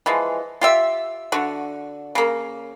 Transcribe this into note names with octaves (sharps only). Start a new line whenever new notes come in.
E3 F3 G#3
F4 G4 E5
D3 F#4
C#3 A#3